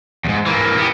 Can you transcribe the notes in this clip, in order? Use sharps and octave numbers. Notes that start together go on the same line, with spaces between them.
E2 G#2
E3 A#3
B3 G4